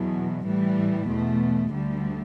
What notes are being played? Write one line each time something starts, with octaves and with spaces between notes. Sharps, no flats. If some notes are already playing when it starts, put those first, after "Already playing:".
Already playing: E2 B2 F#3
A2 E3 G3
E2 B2 A3
D2 D3 G3